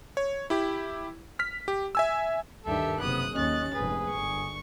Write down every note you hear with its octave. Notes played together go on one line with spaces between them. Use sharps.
C#5
E4 G4
F6 B6
G4
E5 G#5 E6
D2 G2 D#3 G4 A4 E5
F#1 C3 B3 D#6 F#6
D#2 C#4 D#5 F#6 A6
F1 G#2 G#4 B4
G1 C#6